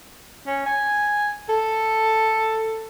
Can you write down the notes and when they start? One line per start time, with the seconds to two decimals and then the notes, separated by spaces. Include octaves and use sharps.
0.47 C#4
0.66 G#5
1.49 A4